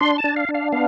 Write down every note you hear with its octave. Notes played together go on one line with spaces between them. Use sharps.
D4 C6
A5
D4
F5
D4
F5
B3 F5